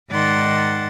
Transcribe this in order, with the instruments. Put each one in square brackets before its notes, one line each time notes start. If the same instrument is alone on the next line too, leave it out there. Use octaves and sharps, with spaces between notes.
[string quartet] G#2 D#3 D5 F#5 C6 A6